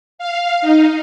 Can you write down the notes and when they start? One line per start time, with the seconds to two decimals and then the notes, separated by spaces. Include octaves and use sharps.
0.19 F5
0.61 D#4